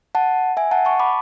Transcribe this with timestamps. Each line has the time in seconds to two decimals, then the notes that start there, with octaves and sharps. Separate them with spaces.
0.15 F#5 A5
0.57 E5 G#5
0.71 F#5 A5
0.85 A5 C#6
1.00 B5 D6